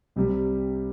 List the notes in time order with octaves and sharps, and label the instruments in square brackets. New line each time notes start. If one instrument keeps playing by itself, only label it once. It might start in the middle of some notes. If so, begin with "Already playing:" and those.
[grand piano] C2 C3 G3